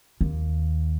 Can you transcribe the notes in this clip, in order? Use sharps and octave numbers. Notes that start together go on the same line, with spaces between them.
D#2